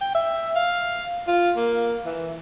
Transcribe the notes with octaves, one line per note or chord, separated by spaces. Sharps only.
G5
E5
F5
F4
A#3
E3